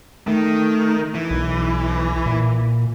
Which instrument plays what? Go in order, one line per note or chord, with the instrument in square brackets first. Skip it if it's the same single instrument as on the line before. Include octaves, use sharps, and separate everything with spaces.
[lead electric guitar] D#3 [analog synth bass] A3
[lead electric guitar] E3
[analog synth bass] B1
A#2